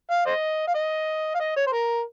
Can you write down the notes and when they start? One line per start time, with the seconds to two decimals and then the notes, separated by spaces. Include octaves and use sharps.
0.10 F5
0.26 C5 D#5
0.67 F5
0.74 D#5
1.35 F5
1.40 D#5
1.56 C#5
1.67 C5
1.73 A#4